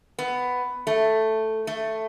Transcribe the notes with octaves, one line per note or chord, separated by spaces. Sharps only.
B3
A3
A3